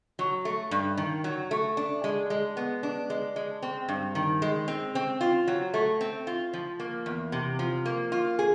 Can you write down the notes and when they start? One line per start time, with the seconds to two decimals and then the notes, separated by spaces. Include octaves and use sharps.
0.19 F#3
0.45 A3
0.71 G2
0.97 D#3
1.24 F#3
1.51 A3
1.77 D4
2.04 G#3
2.30 G#3
2.57 B3
2.83 D4
3.10 G#3
3.36 G#3
3.63 C4
3.89 G2
4.15 D#3
4.42 G#3
4.68 C4
4.95 C4
5.21 F4
5.48 F#3
5.74 A3
6.01 C4
6.27 F4
6.54 F3
6.80 A#3
7.06 E2
7.32 C3
7.59 F3
7.86 A#3
8.12 F4
8.39 G#4